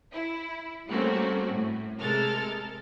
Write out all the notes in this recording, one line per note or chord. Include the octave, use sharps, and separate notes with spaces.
E4
G3 A3 A#3 C4 C#4 F#4
A2
C3 G#3 A4 A#4 F6 A6